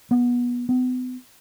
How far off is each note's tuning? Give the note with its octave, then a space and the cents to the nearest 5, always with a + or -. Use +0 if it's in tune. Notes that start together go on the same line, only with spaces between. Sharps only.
B3 -20
B3 +40